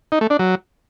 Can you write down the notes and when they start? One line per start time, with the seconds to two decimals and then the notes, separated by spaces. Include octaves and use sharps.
0.12 D#4
0.21 A3
0.30 D4
0.39 F#3